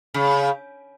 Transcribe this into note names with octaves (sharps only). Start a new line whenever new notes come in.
C#3